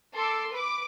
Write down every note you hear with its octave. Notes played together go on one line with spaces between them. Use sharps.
A4 C6 D6 E6
B4 D6